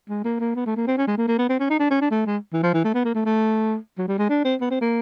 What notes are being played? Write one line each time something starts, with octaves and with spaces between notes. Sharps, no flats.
G#3
A#3
A#3
B3
A3
A#3
C4
C#4
G#3
A#3
A#3
B3
C4
C#4
D#4
D4
C#4
D4
A3
G#3
E3
F3
E3
A3
B3
A#3
A3
A3
F#3
G3
G#3
D4
C4
B3
C4
A#3